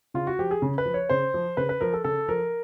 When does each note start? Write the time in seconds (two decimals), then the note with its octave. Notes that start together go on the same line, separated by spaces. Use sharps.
0.14 C#3 F4
0.27 F#4
0.39 F3 G4
0.51 G#4
0.62 C#3
0.78 B4
0.85 F3
0.94 C#5
1.09 C#3 C5
1.34 F3
1.57 C#3 B4
1.69 B4
1.81 F3 A#4
1.93 A4
2.04 C#3 A4
2.28 F3 A#4